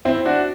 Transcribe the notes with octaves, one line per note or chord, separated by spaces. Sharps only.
C4 E4
D4 F#4